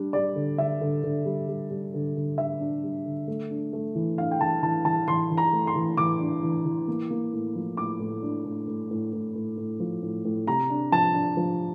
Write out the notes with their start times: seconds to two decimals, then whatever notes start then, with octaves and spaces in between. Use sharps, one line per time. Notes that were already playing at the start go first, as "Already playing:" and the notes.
Already playing: G3 D4
0.13 G3 D5
0.36 D3
0.58 D3 E5
0.81 D3
1.03 D3
1.25 G3
1.48 G3
1.70 G3
1.94 D3
2.16 D3
2.38 D3 E5
2.60 D4
2.83 G3
3.05 D3
3.28 A3
3.51 D4
3.73 A3
3.95 E3
4.18 D4 F5
4.31 G5
4.40 E3 A5
4.63 E3 A5
4.85 E3 A5
5.08 E3 C6
5.31 E3
5.37 A#5
5.53 A3
5.67 C6
5.76 E3
5.97 E3 D6
6.20 D4
6.43 E3
6.66 E3
6.88 A#3
7.10 A#3
7.33 A2
7.56 F3
7.77 A2 D6
8.00 A2
8.23 D4
8.45 A2
8.67 A2
8.91 A2
9.13 A2
9.35 A2
9.57 A2
9.80 F3
10.03 A2
10.25 A2
10.47 C3 A#5
10.70 D4
10.92 F3 A5
11.14 D4
11.37 F3